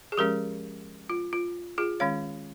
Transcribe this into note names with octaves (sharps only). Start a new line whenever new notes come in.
G#4
F3 G#3 C#4 G4 A#4
F4
F4
F4 G#4
D#3 G#3 C#4 C#5 F5